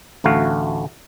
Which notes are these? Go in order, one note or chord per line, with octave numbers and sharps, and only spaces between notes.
A1 D2 A3 F#4 F5